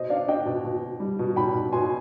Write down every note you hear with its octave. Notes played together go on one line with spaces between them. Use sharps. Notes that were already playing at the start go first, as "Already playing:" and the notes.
Already playing: B2 C5 D#5
D4 D5 F5
D4 D#5 G5
B2
B2
B2
G3
B2
B2 G5 B5
B2
B2 G#5 C6